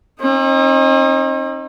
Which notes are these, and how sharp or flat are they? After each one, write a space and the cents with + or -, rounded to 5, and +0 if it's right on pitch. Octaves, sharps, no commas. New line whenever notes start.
C4 +45 D#4 +0